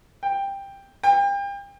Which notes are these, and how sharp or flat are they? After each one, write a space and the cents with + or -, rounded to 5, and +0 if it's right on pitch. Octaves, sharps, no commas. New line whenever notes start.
G5 +10
G5 +35